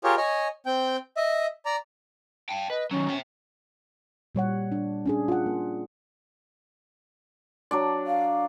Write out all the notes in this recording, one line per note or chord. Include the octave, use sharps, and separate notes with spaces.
F4 G4 G#4 A#4 C#5
C#5 D#5 G#5
C4 G5
D#5 E5
D5 A#5
G5 A5
B4 D#5
D#3 F#3 C#4
E5 G5
A#2 G3 C#5 F#5
D4
C#4 D4 G#4
F4 F#5
A#3
F#3 D4 D5
F5